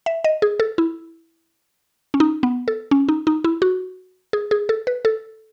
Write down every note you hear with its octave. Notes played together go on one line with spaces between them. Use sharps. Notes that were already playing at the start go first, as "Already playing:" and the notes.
E5
D#5
G#4
A4
E4
C#4
D#4
B3
A4
C#4
D#4
D#4
E4
F#4
G#4
G#4
A4
B4
A4